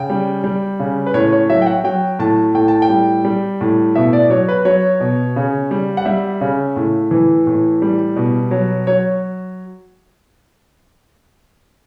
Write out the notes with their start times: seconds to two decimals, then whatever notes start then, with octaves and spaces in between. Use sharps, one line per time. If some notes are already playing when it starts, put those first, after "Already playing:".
Already playing: C#3 G5
0.10 G3
0.44 G3
0.80 C#3
1.06 B4
1.14 A2 C#5
1.32 C#5
1.49 F#3 E5
1.62 G5
1.66 F#5
1.84 F#3 G5
2.19 A2 A5
2.55 A2 G5
2.68 A5
2.82 G5
2.89 G3
3.25 G3
3.61 A2
3.95 B2 E5
4.13 D5
4.30 F#3 C#5
4.48 B4
4.65 F#3 C#5
5.00 B2
5.36 C#3
5.71 G3
5.97 F#5
6.05 G3 E5
6.41 C#3
6.76 A2
7.11 E3
7.47 A2
7.82 G3
8.16 B2
8.51 F#3
8.87 F#3 C#5